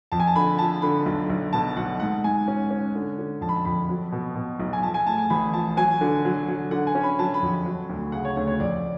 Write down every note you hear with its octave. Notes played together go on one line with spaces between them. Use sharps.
F2 A5
G#5
A5
D3 B5
F3 A5
D3 B5
B1
B1
B2 A5
B1 F#5
G#2 F#5
G#2 G#5
C#4
C#4
D3
D3
F2 A5
B5
A5
F2 B5
F#3
B2
B2
B1
G#5
F3 A5
G#5
A2 A5
G#5
A1 B5
F3 A5
F#3 G#5
D3
F#3
F#3
D3 F#5
G#5
C#4
B5
F#3 A5
B5
F2
F#3
D2
C#3 F#5
C#5
D2 C#5
C#5
F2 D5